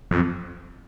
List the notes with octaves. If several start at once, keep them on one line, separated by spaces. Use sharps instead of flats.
F2